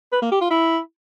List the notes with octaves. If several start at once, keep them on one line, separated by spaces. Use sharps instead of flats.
B4
A#3
G4
F4
E4